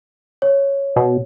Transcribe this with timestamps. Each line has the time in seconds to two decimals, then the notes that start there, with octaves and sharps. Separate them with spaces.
0.42 C#5
0.96 B2